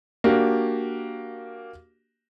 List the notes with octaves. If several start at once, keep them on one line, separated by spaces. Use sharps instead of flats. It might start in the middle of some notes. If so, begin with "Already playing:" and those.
A#3 D4 F#4 G4